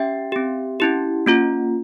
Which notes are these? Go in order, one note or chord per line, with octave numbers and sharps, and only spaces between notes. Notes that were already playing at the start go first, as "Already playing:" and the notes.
Already playing: C#4 G4 E5 G5
C4 G4
C#4 E4 G4
A#3 C#4 F4